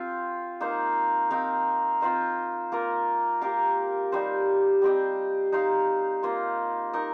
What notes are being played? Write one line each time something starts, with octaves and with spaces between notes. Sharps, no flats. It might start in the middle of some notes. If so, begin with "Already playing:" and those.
Already playing: C4 F4 C5
A#3 D#4 C5 F5
C4 D#4 A#4 F5
C4 F4 C5 D#5
A#3 F4 A#4
A#3 G4 A#4 F5
G3 D#4 C5
G3 C4 G4 D#5
D#4 C5 F5
A#3 F4 C5
D#4 A#4 D#5